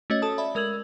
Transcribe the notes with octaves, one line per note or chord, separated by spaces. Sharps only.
A3 C#4 F#4 C#5 D#5
A4 A5 D#6
D5 E5 B5
G#3 A#4 E6 G#6 F#7